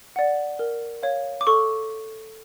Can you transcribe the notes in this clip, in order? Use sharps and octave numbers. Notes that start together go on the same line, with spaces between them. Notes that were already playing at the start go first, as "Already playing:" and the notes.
D5 F#5
A#4
C#5 F5
D6
A4 C#6